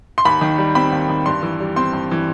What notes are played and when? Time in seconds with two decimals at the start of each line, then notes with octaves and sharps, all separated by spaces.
0.18 C6
0.25 D#2 B5
0.41 D#3
0.58 G3
0.75 C4 B5
0.93 D#2
1.09 D#3
1.26 G2 C6
1.43 E3
1.60 G3
1.76 C4 C6
1.93 G2
2.11 E3